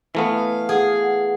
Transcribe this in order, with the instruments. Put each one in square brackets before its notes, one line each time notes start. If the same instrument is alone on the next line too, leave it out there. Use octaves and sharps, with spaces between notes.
[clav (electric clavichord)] E3 A3 B3 [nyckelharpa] F5
[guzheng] G#4 [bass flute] F#5